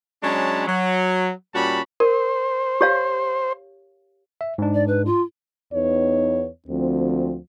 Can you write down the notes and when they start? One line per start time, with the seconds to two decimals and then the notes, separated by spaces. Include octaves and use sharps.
0.23 F#3 G#3 C#4 D4 A5 B5
0.67 F#3
1.54 A#2 G3 C#4 F#4 A5 B5
2.00 A#4 C5
2.81 G4 C#5 F5
4.41 E5
4.58 G#2 D4
4.74 D5
4.87 B4
5.06 F4
5.73 E2 B3 D#4 C#5
6.69 D2 F3 C4